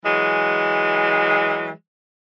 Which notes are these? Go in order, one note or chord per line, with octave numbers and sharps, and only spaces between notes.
E3 F#3 G#3